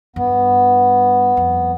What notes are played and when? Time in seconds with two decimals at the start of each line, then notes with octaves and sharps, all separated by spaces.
0.16 G2 B3
1.37 F2